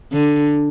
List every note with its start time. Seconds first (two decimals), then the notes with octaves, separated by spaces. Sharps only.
0.13 D3